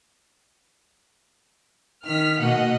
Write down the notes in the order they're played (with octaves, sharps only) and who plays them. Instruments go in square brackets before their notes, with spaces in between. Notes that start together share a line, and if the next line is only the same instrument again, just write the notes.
[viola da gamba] D#3 [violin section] F6 B6
[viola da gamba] B2 A#3 [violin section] D#5 F#5